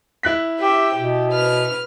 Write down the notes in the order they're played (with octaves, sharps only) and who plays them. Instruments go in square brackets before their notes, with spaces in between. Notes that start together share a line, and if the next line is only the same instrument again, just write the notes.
[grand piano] E4 F#6 B6
[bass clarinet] G4 [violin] E5 G5
[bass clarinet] B2 [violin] G4
[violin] B4 F6